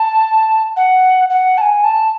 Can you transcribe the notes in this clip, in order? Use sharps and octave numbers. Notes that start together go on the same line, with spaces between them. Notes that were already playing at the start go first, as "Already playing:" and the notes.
Already playing: A5
F#5
F#5
A5
G#5
A5